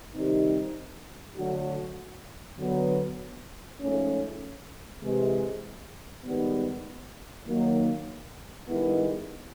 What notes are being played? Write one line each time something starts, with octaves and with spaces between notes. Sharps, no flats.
C3 D#3 G3 C4 D#4
D3 F#3 A3 D4 F#4
D3 F#3 B3
G#2 F3 A3 C#4
C3 E3 G#3
G#2 D#3 G3 B3
D#3 F#3 A#3
G2 D#3 G#3 B3 E4